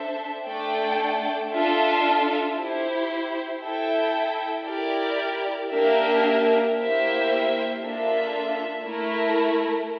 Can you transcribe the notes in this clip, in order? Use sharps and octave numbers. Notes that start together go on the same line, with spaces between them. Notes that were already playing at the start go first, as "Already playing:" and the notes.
Already playing: D4 A4 C5 E5
A3 D4 A4 D5 G5
D4 F4 A4 E5
E4 G4 C5
E4 A4 E5 G5
E4 G4 A#4 D5
A#3 D4 G4 A#4 E5
A#3 E4 G4 C5 E5
A#3 D4 F4 A4 E5
A3 E4 A#4